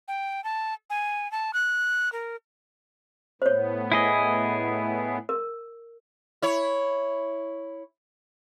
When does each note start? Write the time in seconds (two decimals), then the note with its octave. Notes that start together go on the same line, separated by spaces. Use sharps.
0.08 G5
0.44 A5
0.90 G#5
1.32 A5
1.53 F#6
2.12 A#4
3.42 A2 B3 C5 C#5
3.92 E4 G#4 D#5
5.29 A#4
6.42 E4 C#5